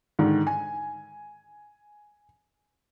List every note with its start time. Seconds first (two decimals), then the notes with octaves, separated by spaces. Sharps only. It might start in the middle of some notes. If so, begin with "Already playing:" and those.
0.19 G#2 D3 D#3
0.47 G#5